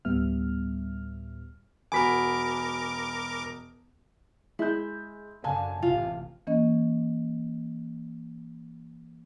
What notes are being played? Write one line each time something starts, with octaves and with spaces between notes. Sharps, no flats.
D2 A2 G3 B3 E5 F6
E1 F#4 A#4 G#5 B5 D6 B6
G#3 E4 G6
F#2 D3 F5 G#5 A5
A1 C3 F4
E3 A#3 C#4 D#5